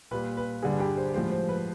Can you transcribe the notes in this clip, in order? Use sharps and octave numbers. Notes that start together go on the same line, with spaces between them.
A#2 G3 B4
B4
G2 D3 G3 G#4
G4
C5
A2 F3 G#3 C5
C5
B4